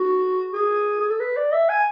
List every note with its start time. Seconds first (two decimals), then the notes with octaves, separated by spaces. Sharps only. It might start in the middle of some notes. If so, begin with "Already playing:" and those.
Already playing: F#4
0.53 G#4
1.00 G#4
1.09 A4
1.20 B4
1.37 D5
1.52 E5
1.69 G#5